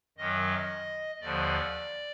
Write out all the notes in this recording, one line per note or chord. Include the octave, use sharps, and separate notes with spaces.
F#2 D#3 F#3 D#5
D#2 D3 F3 D5